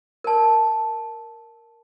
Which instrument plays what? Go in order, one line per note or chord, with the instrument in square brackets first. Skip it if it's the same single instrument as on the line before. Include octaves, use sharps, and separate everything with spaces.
[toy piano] A#4 A5